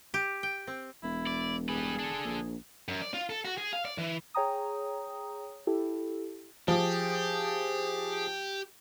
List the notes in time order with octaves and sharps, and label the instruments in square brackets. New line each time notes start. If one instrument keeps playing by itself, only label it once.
[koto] G4
G5
C4
[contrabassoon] E1 [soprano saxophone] E4
[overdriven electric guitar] D5
[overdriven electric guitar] G3 B4 [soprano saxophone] G#4
[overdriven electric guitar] D4 A4
[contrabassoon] A#1
[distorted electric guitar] F#2
D5
F4
A4
F#4
G#4
F5
D5
E3
[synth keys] G#4 C#5 G5 A#5 D#6
E4 G4 A4
[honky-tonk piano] F3 [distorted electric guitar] G4 [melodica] G#4